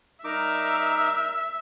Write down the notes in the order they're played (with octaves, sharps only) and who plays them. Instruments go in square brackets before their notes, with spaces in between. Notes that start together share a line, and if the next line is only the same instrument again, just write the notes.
[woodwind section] G3 A#4 [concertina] D#4 D6 [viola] E5